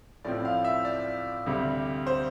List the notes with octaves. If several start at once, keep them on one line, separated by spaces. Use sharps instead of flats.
A2 F3 C4 E4 D5
F5
E5
D5
D2 C3 G3
C5